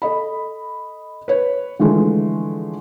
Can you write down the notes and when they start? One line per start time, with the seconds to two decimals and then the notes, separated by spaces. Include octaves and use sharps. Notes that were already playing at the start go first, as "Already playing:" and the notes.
0.02 A4 D#5 B5
1.28 B4 C#5
1.79 D3 E3 F3 G#3 A3